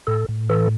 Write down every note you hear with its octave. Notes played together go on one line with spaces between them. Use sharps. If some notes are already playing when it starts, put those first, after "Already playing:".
A2 A4
A2
E3 A4